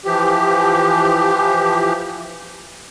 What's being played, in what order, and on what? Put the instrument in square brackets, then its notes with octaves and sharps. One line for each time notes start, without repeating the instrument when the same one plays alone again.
[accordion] E3 F3 G4